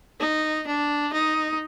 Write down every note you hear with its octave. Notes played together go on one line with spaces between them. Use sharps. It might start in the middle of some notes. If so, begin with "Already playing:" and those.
D#4
D4
D#4